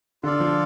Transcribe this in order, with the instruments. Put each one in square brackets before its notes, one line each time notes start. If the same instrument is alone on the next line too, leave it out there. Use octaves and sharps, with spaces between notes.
[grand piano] D3 [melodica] F4 A4 D5 F5
[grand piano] F3